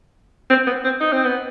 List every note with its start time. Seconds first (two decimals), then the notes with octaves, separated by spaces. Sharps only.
0.50 C4
0.67 B3
0.84 C4
1.01 D#4
1.13 C4
1.24 B3